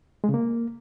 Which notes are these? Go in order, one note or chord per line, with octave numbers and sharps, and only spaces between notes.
G#3
C#3
A#3